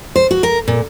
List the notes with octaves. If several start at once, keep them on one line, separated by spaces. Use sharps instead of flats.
C5
F#4
A#4
A#2